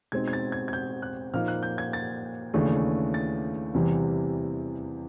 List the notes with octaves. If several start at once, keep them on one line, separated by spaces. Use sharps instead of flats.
B2 G#3 C4 D#4 G#6
G#6
A6
G#6
G#6
G6
F#6
A#2 F3 A#3 D#4 F6
F#6
G6
G#6
A6
D#2 C#3 E3 A3 D4
A6
E2 C3 E3 G3